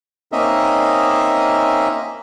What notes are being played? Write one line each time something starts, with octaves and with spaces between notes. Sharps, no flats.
A#3 C4 C#4 D#4 D#5 E5